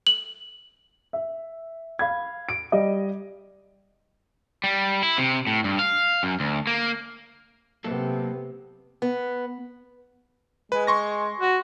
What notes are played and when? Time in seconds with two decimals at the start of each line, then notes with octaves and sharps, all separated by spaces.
0.07 F#7
1.13 E5
1.99 F5 B5 G#6
2.49 D7
2.72 G3 D#5
4.64 G3
5.03 E4
5.18 C3
5.47 A2
5.64 G2
5.79 F5
6.23 F#2
6.40 D2
6.67 A#3
7.84 C3 F#3 A#3 B3 A4
9.02 B3
10.72 G#3 B4
10.87 C6 C#6 A#6
11.40 F#4